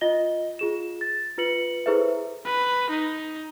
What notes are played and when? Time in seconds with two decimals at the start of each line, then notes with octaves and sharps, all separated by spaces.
0.01 F4 D#5 A#6 G7
0.59 F4 G#4 E7
1.01 A6
1.38 F4 B4 C#7 F#7
1.86 E4 G#4 A4 B4 C5 E5
2.45 B4
2.90 D#4